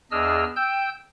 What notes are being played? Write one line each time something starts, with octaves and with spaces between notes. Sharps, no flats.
E2 D4 G#4 D#5 E6 F6
G5 E6 G6